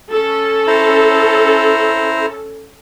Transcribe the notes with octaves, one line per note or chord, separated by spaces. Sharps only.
C#4 A4
E4 C5 A#5